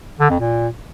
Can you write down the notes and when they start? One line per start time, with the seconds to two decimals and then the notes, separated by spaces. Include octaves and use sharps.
0.20 D3
0.30 F2
0.40 A#2